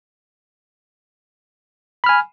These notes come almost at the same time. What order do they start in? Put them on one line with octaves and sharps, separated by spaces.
B5 F6 G#5